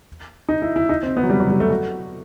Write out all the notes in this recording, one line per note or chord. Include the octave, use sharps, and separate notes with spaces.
D#4
E4
E4
D#4
C4
B3
F#3
G3
F#3
G3
A3
F#4